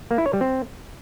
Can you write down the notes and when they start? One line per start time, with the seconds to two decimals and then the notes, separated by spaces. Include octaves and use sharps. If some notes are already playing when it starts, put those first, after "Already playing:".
0.11 A#3
0.18 E4
0.26 C#5
0.33 G3
0.41 C4